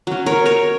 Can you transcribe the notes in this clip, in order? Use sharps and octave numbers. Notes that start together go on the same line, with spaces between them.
F#3 C#4
A#4 C#5
A#4 C#5